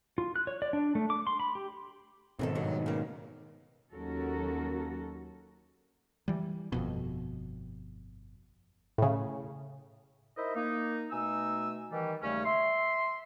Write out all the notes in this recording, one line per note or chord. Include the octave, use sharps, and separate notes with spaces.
F4
F#6
C#5
D5
D4
A3
D6
C6
B5
G4
G#2 B2 D#3 C4 G#4 A4
G2 F#3
C#3 A#3
D#2 F#3 C#4 F#4 A4 A#4
E3 G3
G1 F2 B2
A2 C#3
D#4 E4 A#4 C5 D#5 E5
A#3 D#4
B2 A3 D#4 G#5 E6
D#3 E3 G3
D#2 C#3 G3 A3 C#4
E5 C6